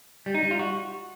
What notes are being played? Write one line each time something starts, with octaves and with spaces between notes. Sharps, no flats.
G3
D#4
G3
F4
F#4